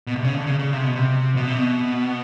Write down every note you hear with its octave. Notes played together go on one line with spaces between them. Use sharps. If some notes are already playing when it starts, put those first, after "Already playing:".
B2
C3
C#3
D3
C#3
C#3
C3
B2
C3
B2
C3
B2